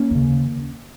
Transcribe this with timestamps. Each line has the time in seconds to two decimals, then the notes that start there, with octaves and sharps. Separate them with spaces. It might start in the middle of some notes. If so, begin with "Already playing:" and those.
Already playing: A#3 C#4
0.11 D#2 C#3